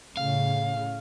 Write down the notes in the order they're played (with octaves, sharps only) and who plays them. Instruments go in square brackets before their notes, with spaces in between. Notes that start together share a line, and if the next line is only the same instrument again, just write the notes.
[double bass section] A2 C#3 [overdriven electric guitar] F5